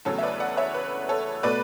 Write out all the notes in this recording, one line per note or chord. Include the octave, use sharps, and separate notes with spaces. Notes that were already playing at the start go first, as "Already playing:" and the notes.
E2 C#3 F#3 A3 A4 C#5
E5
B4 D5
D5 F#5
C#5 E5
B4
A4 C#5
B2 A3 B4 D5